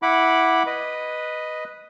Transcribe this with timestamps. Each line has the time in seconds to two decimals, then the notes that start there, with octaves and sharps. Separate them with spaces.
0.02 E4 F#5 B5 D6
0.66 B4 D#5